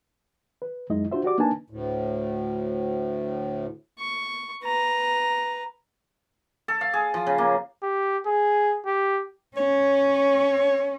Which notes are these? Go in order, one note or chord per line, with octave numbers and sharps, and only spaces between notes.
B4
F#2 G#3 D#4 E4 D#5
D4 F4 F#4 C5 E5
F#4 G4 D5 D6
A#3 D4 D#4 B4 G#5 A5
D2 A2
C#6
B4 A#5
A4
F5
G#4
F3
C#3
A#3
G4
G#4
G4
C#4 C#5